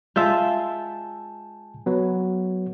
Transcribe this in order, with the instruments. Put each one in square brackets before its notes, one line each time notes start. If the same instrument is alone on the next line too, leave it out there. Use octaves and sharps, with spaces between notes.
[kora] G#3 F4 E5 [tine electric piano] G#5 A5 G6
[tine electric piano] F#3 B3